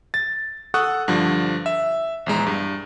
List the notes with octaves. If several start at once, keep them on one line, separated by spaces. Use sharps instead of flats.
A6
A4 F#5 C#6 D#6 F#6
G2 D3 F3
E5
A#1 E2 G#3 A#5
G2